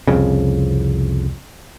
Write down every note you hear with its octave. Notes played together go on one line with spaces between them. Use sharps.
C2 F2 C#3